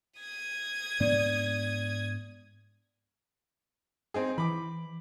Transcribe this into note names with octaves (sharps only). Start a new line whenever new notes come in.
D#6 G#6
G#2 B3 D4 D5
C4 D#4 G#4
E3 B5 D6